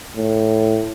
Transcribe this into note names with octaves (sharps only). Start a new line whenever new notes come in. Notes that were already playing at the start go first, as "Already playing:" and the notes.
A2